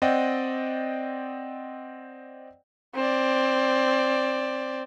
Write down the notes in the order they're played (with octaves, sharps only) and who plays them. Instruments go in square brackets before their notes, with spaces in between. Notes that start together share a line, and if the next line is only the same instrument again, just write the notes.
[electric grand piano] C4 D5 D#5 F#5 G5
[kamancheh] C4 D5